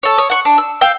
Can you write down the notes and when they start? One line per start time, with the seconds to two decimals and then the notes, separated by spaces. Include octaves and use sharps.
0.03 A4 C#5
0.18 C#5 D#6
0.30 F#5 C#6
0.45 D4
0.58 E6
0.81 F5 G5 E6